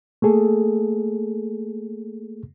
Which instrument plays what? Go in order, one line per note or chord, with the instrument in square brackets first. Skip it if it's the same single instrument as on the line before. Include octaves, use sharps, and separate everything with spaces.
[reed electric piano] A3 A#3 G#4 A4